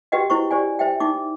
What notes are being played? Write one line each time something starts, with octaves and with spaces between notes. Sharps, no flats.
F#4 G4 B4 D#5 F#5 G5
E4 C5 C#6
G4 C5 D5 G#5
C5 E5 G5
D#4 D6